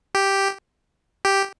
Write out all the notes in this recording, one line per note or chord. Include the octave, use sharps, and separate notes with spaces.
G4
G4